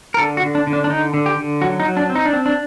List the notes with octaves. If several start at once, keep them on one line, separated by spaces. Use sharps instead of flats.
A#4
D3 A4
F#4
D3
D4
D3
D4
D4
D3 D#4
D3
G4
D3
F#3 F#4
D#4
F#3
D4
C4
D#4
D4
C4
D4